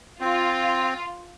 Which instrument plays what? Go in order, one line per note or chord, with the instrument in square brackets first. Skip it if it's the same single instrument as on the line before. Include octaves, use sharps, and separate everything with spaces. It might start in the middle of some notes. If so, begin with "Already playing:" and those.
[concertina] C4 [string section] F4